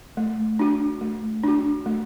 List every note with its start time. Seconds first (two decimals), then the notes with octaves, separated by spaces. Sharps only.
0.17 A3
0.59 D4 F#4
1.01 A3
1.43 D4 F#4
1.86 A3